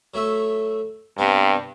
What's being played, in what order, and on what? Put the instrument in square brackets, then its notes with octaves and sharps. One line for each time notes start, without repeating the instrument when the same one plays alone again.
[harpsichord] F#3 A3 E5
[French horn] G2 [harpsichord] C3 B3